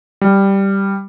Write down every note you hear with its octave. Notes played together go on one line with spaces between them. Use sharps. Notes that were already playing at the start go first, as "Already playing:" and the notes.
G3